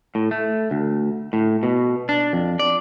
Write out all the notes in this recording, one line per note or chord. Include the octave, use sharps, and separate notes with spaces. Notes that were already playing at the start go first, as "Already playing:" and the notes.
A2
A3
D2
A2
B2
D4
F2
D5